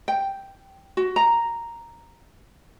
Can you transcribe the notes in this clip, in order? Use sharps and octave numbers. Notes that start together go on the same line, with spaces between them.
G5
F#4
A#5